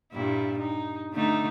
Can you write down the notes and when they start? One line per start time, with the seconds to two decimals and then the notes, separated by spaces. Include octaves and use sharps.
0.12 G2 A#2 E4
0.58 D#4
1.13 D3 A3 D#4